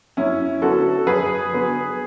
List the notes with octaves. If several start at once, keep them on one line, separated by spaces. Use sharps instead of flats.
F#2 C#4 E4
D3 F#3 B3 F#4 A4
F#2 G#4 B4
D3 F#3 B3